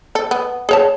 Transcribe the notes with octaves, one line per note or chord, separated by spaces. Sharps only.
A4
B3
G#4 C#5 A5